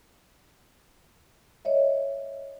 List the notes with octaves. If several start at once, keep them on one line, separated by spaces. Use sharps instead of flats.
C#5 D#5 E5